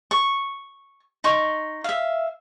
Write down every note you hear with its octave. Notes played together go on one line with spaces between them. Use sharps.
C#6
D#4 C6 C#6
E5 F5